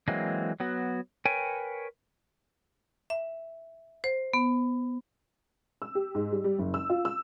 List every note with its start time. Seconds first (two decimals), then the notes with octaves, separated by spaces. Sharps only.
0.08 E3 F#3 G#3 A#3 C4
0.60 F#3 B3 F#4
1.25 A#4 B4 C#5 G5 G#5
3.10 E5
4.04 C5
4.34 B3
5.82 E6
5.95 G4
6.15 G#2
6.32 G3
6.44 G3
6.59 F#1
6.74 E6
6.89 F4
7.05 E6